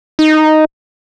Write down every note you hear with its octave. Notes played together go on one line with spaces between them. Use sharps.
D#4